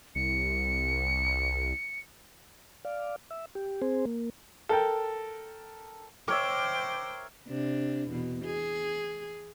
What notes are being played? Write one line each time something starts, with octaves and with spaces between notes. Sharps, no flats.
C2 C#7
D5 F5
E5
G4
C4 G#4 C5
A#3
A4 A#4 G5
A#4 C5 C#5 E5 G5 D6
C3 D4
E2 B2
G#4